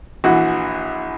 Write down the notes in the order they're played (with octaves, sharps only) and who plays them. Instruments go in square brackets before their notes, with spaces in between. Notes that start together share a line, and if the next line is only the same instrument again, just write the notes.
[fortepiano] A#1 E3 F#4